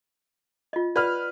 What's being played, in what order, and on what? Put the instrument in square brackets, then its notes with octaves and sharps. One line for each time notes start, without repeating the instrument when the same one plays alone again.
[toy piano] F4 D#5
[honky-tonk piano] B4 F6 [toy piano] D5 F#5